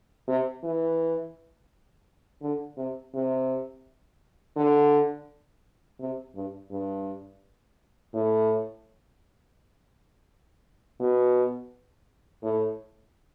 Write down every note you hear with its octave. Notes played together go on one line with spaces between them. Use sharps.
C3
E3
D3
C3
C3
D3
C3
G2
G2
A2
B2
A2